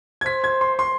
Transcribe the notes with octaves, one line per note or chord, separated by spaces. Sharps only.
G#6
C5 B6
G#6
C6
C6